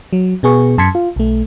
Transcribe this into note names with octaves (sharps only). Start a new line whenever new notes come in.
F#3
B2 B3 G#4 C#6
F#2 A5 C6 G#6 B6 C#7
F4
B1 A3